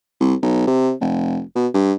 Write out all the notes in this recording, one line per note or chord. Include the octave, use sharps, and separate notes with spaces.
C2
B1
C3
F1
B2
G2